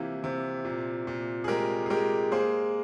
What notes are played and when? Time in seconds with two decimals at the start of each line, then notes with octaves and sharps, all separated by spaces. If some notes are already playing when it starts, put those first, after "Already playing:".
Already playing: C3 E3 A#3 E4 F4 G4
0.24 C3
0.64 A#2
1.07 A#2
1.44 G#4
1.48 G#3 G4 A#4
1.86 G#4
1.90 G#3 G4 A#4
2.32 A#3 G#4 C5